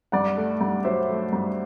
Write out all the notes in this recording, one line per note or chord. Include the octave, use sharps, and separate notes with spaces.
G2 D5 F#5
A3
G2
F#3 C5 E5
A3
G2